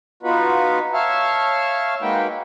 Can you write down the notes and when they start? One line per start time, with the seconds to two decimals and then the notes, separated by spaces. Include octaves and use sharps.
0.23 B3 D#4 F4 F#4 B4
0.93 C#5 E5 F5 A5
2.01 G#3 A#3 D#4 F#4 B4 G5